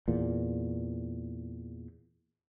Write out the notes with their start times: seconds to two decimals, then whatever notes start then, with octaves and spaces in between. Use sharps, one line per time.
0.08 E2 A#2